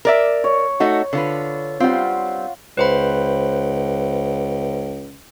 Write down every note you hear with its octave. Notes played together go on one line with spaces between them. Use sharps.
A#4 D5 E5
C#5
A3 D#4 F#4
D3 F4 B4
G3 C4 F4 F#5
C#2 B4 C5 B5